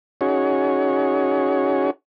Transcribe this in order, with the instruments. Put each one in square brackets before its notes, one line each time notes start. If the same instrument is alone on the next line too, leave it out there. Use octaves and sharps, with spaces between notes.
[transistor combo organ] C#4 D#4 F#4 G#4 C#5